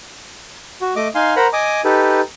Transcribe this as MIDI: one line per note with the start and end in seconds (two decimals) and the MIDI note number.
0.81 0.94 66
0.96 1.08 57
0.96 1.08 75
0.96 1.08 86
1.15 1.34 63
1.15 1.34 77
1.15 1.34 80
1.15 1.34 84
1.36 1.47 70
1.36 1.47 72
1.36 1.47 78
1.36 1.47 82
1.36 1.47 83
1.53 1.81 75
1.53 1.81 80
1.53 1.81 86
1.53 1.81 87
1.84 2.21 63
1.84 2.21 67
1.84 2.21 69
1.84 2.21 71